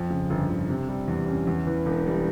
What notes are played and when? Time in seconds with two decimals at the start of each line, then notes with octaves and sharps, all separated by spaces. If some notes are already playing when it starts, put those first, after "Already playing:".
Already playing: F2
0.10 C#3
0.30 G1
0.49 G1
0.69 C3
0.88 G3
1.08 E2
1.28 C#4
1.47 E2
1.67 E3
1.86 E1
2.07 G3